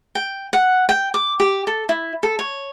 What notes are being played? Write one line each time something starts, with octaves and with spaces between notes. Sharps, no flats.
G5
F#5
G5
D6
G4
A4
E4
A4
C#5